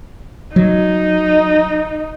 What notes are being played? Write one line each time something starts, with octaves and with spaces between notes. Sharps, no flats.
F#3 D#4